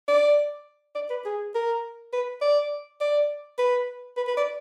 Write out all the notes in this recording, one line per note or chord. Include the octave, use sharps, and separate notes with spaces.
D5
D5
B4
G#4
A#4
B4
D5
D5
B4
B4
B4
D5